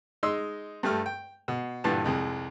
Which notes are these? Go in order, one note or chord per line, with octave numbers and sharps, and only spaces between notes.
G#3 D#4 C6 E6
G2 G3 A3 F6
G5
B2
G2 A#2 D3 E3 G4 A5
C2 F2 G#3